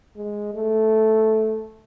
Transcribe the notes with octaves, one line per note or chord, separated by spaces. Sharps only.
G#3
A3